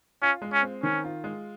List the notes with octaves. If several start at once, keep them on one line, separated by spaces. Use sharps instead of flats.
C#4 F4
G#3
C#4
C4
D#3 C#4
F4
G#3